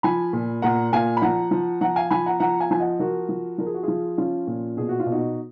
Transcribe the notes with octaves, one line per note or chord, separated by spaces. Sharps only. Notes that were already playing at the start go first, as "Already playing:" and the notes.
F3 G#5 B5
A#2
A#2 F#5 A#5
A#2 F5 G#5
B5
F3 F#5 A#5
F3
F3 F#5 A#5
F5 G#5
F3 G#5 B5
F#5 A#5
F3 F#5 A#5
F5 G#5
F3 G#5
D#5 F#5
F3 F#4 A#4
F3
F3 A#4
G#4
F#4
F3 F4 G#4
F3 C#4 F4
A#2
B2 G#4
F#4
F4
B2
D#4 F#4